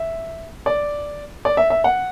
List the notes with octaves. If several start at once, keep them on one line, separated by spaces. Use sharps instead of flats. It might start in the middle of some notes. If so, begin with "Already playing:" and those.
Already playing: E5
D5
D5
E5
E5
F#5